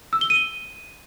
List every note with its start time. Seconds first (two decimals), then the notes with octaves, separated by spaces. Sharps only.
0.13 E6
0.21 G7
0.30 D#7